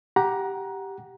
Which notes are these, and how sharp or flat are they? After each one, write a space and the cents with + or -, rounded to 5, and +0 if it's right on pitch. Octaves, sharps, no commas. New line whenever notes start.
G4 -5 F#5 +0 A#5 +20